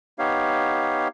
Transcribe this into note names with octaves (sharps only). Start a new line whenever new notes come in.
B3 D#4 G4 C#5 F5